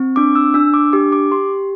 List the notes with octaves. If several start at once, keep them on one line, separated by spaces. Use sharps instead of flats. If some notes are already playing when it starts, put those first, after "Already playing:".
Already playing: C4
D4 D6
E6
D4 E6
D6
G4 D6
D6
G4 C6